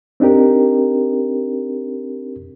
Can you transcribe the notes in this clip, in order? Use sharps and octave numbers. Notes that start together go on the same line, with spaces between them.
C4 D4 D#4 G4 A#4